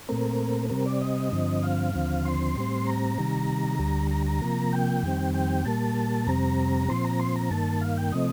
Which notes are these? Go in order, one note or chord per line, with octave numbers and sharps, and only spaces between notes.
A#2 A3 C4 A#4
C3 G3 C4 A#4
D5
D#5
G2 D3 F3 C4
F5
D#2 D3 F3 C4
C6
A2 G3 C4
A#5
C3 D#3 G3
D2 D3 G3
A#5
A#5
C3 F3 A#3
G5
F2 D#3 G3 C4
G5
A#2 G3 A#3 A5
F2 C3 G3 C4 A#5
A#2 F3 C4 C6
A#5
C6
A#5
G2 D#3 A#3 A5
F5
G5
C3 F3 A3 C4 D#5